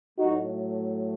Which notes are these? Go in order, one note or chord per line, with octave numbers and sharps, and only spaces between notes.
A2 F#3 A3 D#4 F#4